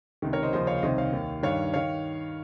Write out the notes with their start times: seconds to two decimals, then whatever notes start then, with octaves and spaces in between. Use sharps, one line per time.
0.22 C#2 C3 D#3
0.33 A#4 C#5
0.43 C5 D#5
0.53 D#2 C#3 F3 C5 D#5
0.67 C#5 F5
0.78 F5
0.83 C2 C3 D#3 C5 D#5
0.98 C#5 F5
1.12 D#2 D#3
1.43 G2 D#3 C#5 F5
1.73 D#3 C#5 F5